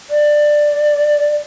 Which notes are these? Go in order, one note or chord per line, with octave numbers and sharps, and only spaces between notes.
D5